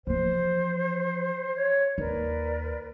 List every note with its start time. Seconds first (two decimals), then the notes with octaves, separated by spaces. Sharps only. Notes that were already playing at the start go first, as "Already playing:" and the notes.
0.07 E3 F3 C5
1.55 C#5
1.98 D#2 A#4 B4 D5